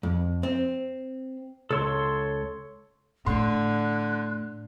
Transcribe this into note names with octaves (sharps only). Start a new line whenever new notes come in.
F2
C4
C#2 A4 C#5 C6
A2 D3 C6 F#6